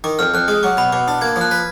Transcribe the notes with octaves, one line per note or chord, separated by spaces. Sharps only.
D#3 D6
F2 F6
F2 F#6
G#3 D#6
F#3 D6
B2 B5
B2 D6
D4
A#3 G#6
F3
F#6
B4